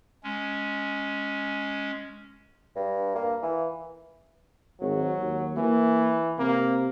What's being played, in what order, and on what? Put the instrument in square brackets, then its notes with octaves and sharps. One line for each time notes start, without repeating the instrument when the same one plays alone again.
[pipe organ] G#3 C#4
[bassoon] G2
A#3
E3
[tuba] G#1 [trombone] F#3
[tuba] D#2
[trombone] E3 [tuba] A#3
[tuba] C3 [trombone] A#3